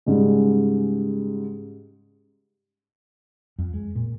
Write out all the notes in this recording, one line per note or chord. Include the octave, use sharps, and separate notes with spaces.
G#2 C#3 G3
F2
G#3
A#2